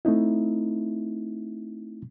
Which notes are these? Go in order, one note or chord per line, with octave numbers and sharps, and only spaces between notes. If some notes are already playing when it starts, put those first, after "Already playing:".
A3 C4 D#4 E4